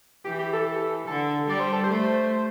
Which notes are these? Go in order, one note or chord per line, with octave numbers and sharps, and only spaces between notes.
E3 G4
G4
A4
D3 A4
G3 D5
C5
A4
C5
A3